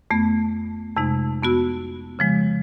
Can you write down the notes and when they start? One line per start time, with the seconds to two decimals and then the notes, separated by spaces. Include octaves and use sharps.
0.10 F2 A3 B3
0.96 F2 C3 G#3 D#4
1.42 F2 B3 F#4 E6
2.19 C#3 F3 G#3